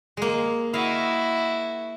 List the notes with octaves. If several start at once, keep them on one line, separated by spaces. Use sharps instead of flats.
G#3 A#3
E4 F#4 D#5 F5